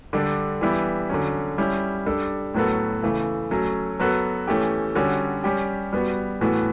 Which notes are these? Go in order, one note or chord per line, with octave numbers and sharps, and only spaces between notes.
D3 G3 D4 A4
E3 G3 B3 E4
D3 F#3 C#4
G3 C#4 E4
G3 D4 A4
A2 F#3 B3 F#4 A4
C#3 E3 A3
F#3 A3 C#4
F#3 B3 F#4 A4
E3 A3 C#4 G4
D3 G3 C#4 F#4 A4
G3 C#4 G4
G3 B3 F#4
A2 E3 B3 F#4 A4